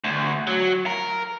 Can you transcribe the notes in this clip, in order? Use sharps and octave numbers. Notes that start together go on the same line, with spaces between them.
D2
F#3
A#4